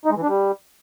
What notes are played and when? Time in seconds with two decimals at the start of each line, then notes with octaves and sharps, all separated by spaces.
0.05 D#4
0.11 G#3
0.17 E3
0.23 D4
0.29 G3